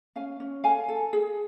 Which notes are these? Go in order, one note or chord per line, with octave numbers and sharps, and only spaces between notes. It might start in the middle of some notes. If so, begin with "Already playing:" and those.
C#4 F5 G#5
C#4
A4 F5 G#5
A4
G#4